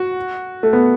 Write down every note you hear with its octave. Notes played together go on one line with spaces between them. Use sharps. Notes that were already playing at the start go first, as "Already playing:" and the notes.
Already playing: F#4
A3
B3